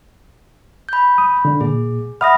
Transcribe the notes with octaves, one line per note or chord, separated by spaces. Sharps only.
B5 G6
D#6
D3 D4
A#2 G#4
E5 F#5 B5 D#6 F6 A#6